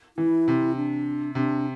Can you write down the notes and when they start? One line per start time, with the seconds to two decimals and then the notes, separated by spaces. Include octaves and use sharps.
0.17 E3 E4
0.48 C3
0.76 D4
1.35 C3 D4